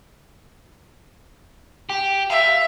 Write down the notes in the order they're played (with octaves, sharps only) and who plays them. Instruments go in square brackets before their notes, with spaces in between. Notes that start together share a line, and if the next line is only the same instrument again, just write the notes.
[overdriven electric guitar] G4
[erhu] E5 [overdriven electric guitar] F5